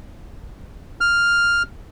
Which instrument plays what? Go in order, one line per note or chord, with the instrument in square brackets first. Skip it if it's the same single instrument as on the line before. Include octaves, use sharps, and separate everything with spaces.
[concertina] F6